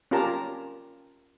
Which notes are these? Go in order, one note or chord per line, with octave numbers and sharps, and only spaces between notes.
C#4 F4 G4 A#4 A5 A#5